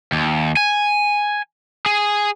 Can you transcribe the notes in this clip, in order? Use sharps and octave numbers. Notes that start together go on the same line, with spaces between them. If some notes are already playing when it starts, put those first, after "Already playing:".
D#2
G#5
G#4